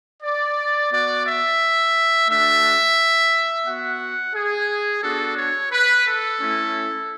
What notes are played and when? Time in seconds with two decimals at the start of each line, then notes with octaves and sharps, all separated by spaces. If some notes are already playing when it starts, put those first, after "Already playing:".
0.23 D5
0.91 B3 F#4 D5
1.25 E5
2.28 A3 D4 F#4 E5
3.65 B3 F#4 F#5
4.34 G#4
5.02 B3 D4 F#4 A4
5.37 C#5
5.71 B4
6.06 A4
6.40 A3 C#4 E4